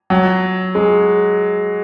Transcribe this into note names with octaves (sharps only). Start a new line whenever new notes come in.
F#3
G#3